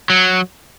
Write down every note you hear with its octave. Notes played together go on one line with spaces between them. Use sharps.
F#3